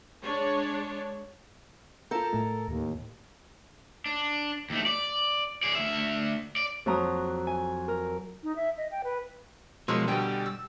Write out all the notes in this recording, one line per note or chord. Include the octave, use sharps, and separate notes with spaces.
G#3 D4 C#5
F4 A4 A#4 G6
A2 A3
D#2
D4
D#2 A3
D5
G#4 D5
D2 E5
D5
F2 F#3 A#5 D#6
G#5
A#4
D#4
E5
D#5
G5
B4
B2 F3 G#3 A#4 C#5 C6 D#6 E6
B2 D3 G3 G5 G#5
E6